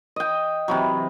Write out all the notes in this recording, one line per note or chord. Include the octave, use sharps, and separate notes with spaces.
D#5 G5
C3 E3 F#3